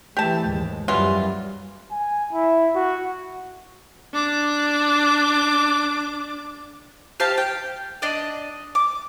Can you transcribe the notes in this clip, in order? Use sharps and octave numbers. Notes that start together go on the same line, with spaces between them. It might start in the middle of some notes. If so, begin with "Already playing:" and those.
E3 A3 G4 A5
D#2 G#2 G#3
F#2 E3 F#3 G3 F4
G#5
E4
F#4
D4 D6
G4 C5 F5 A5
G5
D4 D5 D#5
D6